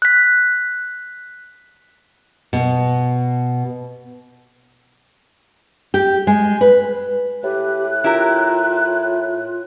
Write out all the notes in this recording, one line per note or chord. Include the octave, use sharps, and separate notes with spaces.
F#6 B6
B2
G4
G#3
B4
A2 G4 F#6
E4 F4 G4 A#4